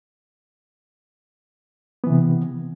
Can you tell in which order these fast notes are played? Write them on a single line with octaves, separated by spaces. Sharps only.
B3 E3 C3